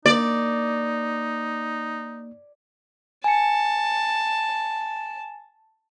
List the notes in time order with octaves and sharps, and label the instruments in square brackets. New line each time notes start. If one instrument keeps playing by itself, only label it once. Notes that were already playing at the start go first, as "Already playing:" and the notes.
[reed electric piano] A#3 [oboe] D#4 [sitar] D5
[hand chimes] G#5 C#7 [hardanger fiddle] A5